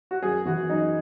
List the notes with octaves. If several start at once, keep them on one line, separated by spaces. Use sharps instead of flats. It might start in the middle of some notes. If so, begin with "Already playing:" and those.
F#4
F#2 G#4
E3 F#4
F#2 D#4